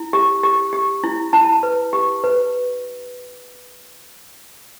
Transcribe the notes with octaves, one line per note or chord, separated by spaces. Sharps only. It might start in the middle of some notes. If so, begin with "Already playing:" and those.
Already playing: E4
G4
G4
G4
E4
E4 A5
B4
G4
B4